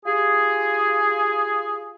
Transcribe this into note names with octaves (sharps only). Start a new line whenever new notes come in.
F4 G4 G#4